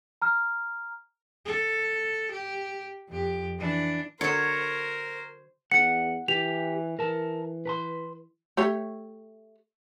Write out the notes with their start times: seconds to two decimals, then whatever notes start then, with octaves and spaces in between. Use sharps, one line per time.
0.22 A#5 F6
1.45 A4
2.31 G4
3.08 F2 G4
3.58 E3 D4
4.21 D3 F#3 A#4 C5 C#5
5.72 E2 F#5 C#7
6.28 E3 G4 F7
6.99 E3 A#4 A5
7.66 B4 A#5 C6
8.57 A3 G4 C#5